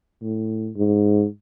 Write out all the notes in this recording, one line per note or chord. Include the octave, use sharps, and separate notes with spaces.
A2
G#2